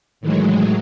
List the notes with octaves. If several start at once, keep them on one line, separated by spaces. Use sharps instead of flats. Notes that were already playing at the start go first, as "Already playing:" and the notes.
A2 D#3 E3 F#3 G#3